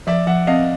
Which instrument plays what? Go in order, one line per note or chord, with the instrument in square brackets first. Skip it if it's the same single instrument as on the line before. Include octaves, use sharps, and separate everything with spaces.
[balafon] F3 [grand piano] D5 E5
[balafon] F3 [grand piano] E5 F#5
[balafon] C4 [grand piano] D#5 F5